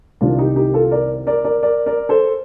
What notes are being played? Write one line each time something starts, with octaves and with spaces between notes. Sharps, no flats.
C2 C3 D#3 D4 F4
D#4 G4
D#4 G4
F4 A4
A#4 D5
A#4 D5
A#4 D5
A#4 D5
A#4 D5
A4 C5